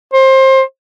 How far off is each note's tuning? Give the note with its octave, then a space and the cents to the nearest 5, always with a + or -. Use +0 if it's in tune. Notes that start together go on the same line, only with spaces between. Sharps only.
C5 +25